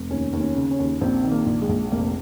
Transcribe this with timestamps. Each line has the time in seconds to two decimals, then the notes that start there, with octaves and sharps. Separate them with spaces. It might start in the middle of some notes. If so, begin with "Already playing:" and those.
Already playing: F1
0.10 D#2 C#4
0.33 D#2
0.41 C#4
0.55 C#3
0.71 C#4
0.79 D#2
1.01 A#1 C4
1.24 D#3
1.31 A#3
1.46 A#1
1.62 G#3
1.69 A#1
1.92 F1 A#3